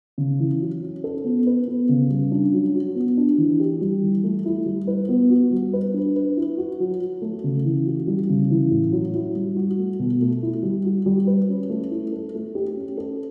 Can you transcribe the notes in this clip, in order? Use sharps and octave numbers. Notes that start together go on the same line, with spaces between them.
C#3
E3
F#3
C#4
A4
B3
B4
B3
C#3
G3
D4
F#3
F#4
B3
D4
E3
G4
G3
E3
A3
E4
G3
B4
B3
F#4
G3
B4
D4
B4
E4
F#4
F#3
F#3
A3
C#3
E3
F#4
G3
C#3
E3
A2
F#3
E4
G3
F#4
A3
B2
A3
E4
G3
F#4
G3
B4
C#4
A3
E4
A4
A3
G4
C#4
A4